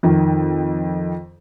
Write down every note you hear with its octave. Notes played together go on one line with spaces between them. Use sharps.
F2 D#3